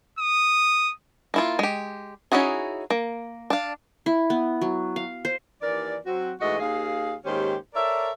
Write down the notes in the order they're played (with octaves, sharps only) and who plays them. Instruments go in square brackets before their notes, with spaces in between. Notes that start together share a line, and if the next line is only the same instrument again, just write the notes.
[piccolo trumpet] D#6
[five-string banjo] A#3 E4 F4
G#3 G4
C#4 D#4 E4 F#4 G#4
A#3
D4 F5
[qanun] E4
B3
F#3
F5
C5
[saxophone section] D#2 E3 A#4 D5
F#3 C4 F#4
G#2 E3 A3 F#4 D#5
D#2 G#4 F5
D#2 G#2 D#3 C#4 G4 C5
A4 A#4 C#5 D5 E5